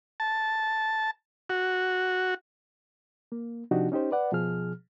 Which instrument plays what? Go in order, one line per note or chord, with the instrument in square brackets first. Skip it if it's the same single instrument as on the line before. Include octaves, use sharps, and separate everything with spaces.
[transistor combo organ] A5
F#4
[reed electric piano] A#3
C3 F3 D4 D#4 F#4 G4
C#4 D#4 G4 C5
B4 D5 F#5
B2 F3 G#4 F6